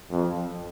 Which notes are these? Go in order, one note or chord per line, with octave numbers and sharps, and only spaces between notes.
F2